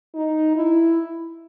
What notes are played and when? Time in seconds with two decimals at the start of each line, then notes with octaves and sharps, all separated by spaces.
0.14 D#4
0.55 E4